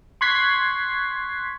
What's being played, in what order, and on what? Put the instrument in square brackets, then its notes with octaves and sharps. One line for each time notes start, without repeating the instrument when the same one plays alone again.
[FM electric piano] C6 C#6 F#6 G#6 B6 C7